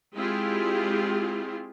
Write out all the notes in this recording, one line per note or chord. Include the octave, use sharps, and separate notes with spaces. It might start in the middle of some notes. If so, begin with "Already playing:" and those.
G#3 C4 E4 F4 G4 G#4